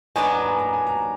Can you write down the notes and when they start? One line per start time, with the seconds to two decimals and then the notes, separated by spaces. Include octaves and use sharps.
0.16 B2 F#3 B3 D4 G#5
0.23 A#5
0.32 G#5
0.40 A#5
0.48 G#5
0.58 A#5
0.73 G#5
0.87 A#5